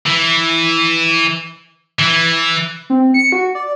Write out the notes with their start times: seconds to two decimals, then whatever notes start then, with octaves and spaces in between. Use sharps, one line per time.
0.06 E3
1.99 E3
2.90 C4
3.14 C#7
3.32 F#4
3.55 D5